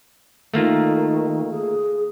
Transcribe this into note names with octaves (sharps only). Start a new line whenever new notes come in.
D#3 A3 A#3 F4
G#4